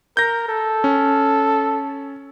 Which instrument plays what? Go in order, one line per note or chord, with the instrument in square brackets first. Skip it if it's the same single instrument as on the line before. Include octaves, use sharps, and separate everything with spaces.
[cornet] A#4 [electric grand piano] G6 A#6
[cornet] A4
[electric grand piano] C#4